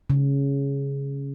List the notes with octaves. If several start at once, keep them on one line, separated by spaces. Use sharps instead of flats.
C#3